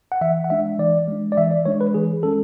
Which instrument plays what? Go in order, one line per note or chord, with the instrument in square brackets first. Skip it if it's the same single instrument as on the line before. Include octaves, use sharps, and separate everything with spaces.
[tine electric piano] F#5
E3 E5
F#5
G#3 D4 E5
E3 D5
G#3 D4
D5
E3 E5
D5
G#3 D4 C#5
B4
E3 G#4
G#3 C#4 A4